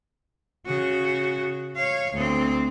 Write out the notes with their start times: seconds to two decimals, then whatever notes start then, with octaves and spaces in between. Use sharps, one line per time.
0.66 C#3 F#4
1.77 C#5 F5
2.13 D2 C4